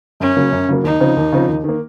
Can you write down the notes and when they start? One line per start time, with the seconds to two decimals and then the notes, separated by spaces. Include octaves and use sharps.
0.20 F#2 C#4
0.37 C#3 F#3 A#3
0.52 F#2
0.68 C#3 F#3 A#3
0.84 D#2 D#4
1.00 C#3 F3 C4
1.17 D#2
1.32 C#3 F3 C4
1.48 D#2
1.64 D#3 A#3